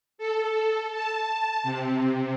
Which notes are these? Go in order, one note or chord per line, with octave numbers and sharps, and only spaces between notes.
A4
A5
C3